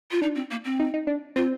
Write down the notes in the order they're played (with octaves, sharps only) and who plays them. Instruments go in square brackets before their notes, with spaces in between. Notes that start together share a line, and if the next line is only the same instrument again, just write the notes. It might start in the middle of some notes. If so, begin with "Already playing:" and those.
[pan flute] F4
[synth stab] D4 [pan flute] D#4
[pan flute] C4
A#3
C4
[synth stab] D#4
D#4
D4
[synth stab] C4 [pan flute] F4